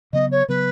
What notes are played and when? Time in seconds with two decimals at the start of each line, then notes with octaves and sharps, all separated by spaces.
0.13 C#3 F#3 B3 D#5
0.31 C#5
0.48 C#3 F#3 B3 B4